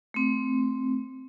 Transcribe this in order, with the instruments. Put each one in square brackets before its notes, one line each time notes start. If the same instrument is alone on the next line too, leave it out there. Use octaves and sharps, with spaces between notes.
[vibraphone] A3 C4